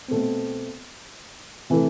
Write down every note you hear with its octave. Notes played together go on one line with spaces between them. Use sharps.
B2 A3 C4
C3 E3 A3